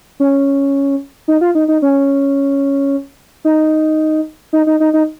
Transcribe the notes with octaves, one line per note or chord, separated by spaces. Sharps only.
C#4
D#4
F4
D#4
D#4
C#4
D#4
D#4
D#4
D#4
D#4